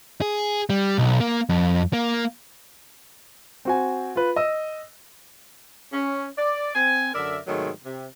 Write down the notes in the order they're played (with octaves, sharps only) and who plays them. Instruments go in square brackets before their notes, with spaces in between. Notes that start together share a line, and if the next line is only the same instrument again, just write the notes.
[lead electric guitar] G#4
G3
B1
A#3
F2
A#3
[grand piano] C4 F#4 G#5
F4 B4
D#5 E6
[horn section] C#4
D5
C4 G#5
F#2 D3 A#4 D5 E5
G#2 C3 D#3 F#3 G#3 A3
C3